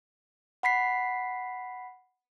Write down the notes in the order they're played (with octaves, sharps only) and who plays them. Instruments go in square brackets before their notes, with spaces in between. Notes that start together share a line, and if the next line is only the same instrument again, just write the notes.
[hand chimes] F#5 B5 B6 C7